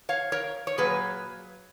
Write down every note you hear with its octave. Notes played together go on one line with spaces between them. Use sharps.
C#5 F5
A#4 C#5
C#5
A#2 F#3 A#3 G#4 B4